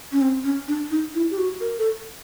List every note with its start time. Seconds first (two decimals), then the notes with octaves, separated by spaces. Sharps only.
0.12 C#4
0.21 C4
0.44 C#4
0.68 D4
0.91 D#4
1.15 E4
1.31 G4
1.38 F#4
1.61 A#4
1.79 A4